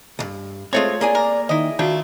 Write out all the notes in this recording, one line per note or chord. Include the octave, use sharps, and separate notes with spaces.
C2 G2
G#3 A3 C4 F4 A4 C#5
A#3 G#4 D5 G#5
A#4
D#3 E4 D#5
D#3 A3 D4 F4 F#4